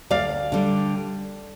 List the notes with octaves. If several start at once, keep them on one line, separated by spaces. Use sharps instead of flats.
D2 D5 F5
D3 G3